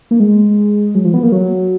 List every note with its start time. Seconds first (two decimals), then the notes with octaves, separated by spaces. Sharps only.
0.11 A#3
0.20 G#3
0.95 F#3
1.04 F3
1.14 B3
1.23 A#3
1.32 F#3